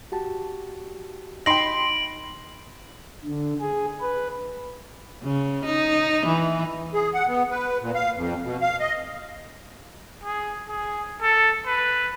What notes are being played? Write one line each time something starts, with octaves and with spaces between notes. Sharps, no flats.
F#4 G4 A5
D#4 G5 B5 C6 A#6 D7 F#7
D3
G#4
B4
C#3
D#4
E3
G#4
F#5
B3
B4
A#2
F5
F2
B2
F5
D#5
G#4
G#4
A4
B4